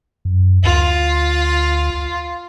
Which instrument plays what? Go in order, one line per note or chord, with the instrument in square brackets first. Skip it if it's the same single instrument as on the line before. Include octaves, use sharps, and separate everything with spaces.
[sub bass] F#2
[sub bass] D2 [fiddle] F4